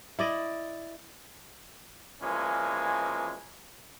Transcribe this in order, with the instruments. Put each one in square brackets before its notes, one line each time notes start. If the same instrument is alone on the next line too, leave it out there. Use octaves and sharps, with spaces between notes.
[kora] E4 D5 D#5
[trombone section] B2 E3 F3 G#3 A#3 C#4